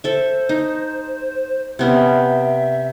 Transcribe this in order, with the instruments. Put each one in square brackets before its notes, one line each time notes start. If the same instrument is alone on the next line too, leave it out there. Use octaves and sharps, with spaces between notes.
[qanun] A4 E5 [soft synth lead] C5
[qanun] D#4
[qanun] C3 B3 C#4 [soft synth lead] E5